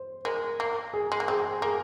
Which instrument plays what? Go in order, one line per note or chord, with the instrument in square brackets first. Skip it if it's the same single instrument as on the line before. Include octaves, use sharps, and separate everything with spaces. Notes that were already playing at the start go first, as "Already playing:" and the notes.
Already playing: [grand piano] C5
[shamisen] G#3 [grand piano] A#4
[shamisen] A#3
[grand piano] G#4
[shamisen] G#3
A#3
[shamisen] C4 [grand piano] G#4
[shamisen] A#3 [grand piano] G#4